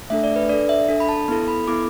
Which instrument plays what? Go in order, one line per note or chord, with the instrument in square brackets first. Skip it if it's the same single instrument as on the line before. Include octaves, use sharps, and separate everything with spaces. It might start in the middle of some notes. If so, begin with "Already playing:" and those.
[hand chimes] A3 D4 A4 E5
D5
B4
D4 A4 D5
E5
D4 A4
B5
A5
B3 E4 A4
B5
B3 E4 A4 D6